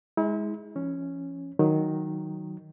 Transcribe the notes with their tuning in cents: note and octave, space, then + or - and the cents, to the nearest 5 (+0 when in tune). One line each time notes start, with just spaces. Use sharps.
G#3 +0 E4 -40
F3 -40 C#4 +0
D#3 +0 F#3 +0